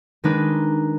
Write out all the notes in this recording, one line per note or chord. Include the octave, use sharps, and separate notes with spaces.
D#3 G#3 D4 D#4 B4